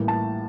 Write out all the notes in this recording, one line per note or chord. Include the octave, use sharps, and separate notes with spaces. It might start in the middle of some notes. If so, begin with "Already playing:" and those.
Already playing: A1 A2 E3 G3 A#3
A5